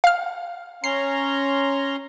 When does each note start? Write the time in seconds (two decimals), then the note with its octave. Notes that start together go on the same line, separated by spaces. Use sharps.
0.04 F5 F6
0.84 C#4 A#5 C6 C7